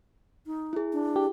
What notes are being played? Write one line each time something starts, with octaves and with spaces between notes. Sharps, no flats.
D#4
E4 G#4
D4
G4